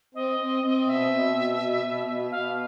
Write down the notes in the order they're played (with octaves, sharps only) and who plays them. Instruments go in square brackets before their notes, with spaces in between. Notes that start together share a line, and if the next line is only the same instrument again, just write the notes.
[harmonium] C4 [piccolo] D#5
[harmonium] C4
C4
[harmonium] B2 [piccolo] E5
[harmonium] B2
B2
B2
B2
B2
[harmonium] B2 [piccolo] F5